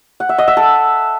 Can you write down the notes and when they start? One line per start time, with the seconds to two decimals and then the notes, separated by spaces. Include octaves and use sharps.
0.20 F#5
0.29 E5
0.38 D#5
0.48 E5
0.57 A4